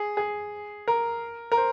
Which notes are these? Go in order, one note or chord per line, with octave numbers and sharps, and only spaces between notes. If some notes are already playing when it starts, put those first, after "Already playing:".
Already playing: G#4
G#4
A#4
A#4
C5